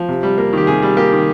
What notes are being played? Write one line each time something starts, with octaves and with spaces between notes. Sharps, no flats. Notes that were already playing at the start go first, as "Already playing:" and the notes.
Already playing: F3
C3
G3
A#3
D#3 G4
C3 G#4
G3
A#3 G4
D#3